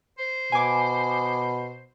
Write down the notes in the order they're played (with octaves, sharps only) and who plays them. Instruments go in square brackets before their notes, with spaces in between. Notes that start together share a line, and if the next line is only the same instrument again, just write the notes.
[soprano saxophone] C5
[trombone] B2 [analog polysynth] G#5 D6